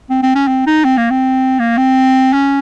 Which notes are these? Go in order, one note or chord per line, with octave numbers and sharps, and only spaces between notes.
C4
C4
C#4
C4
D#4
C4
A#3
C4
A#3
C4
C#4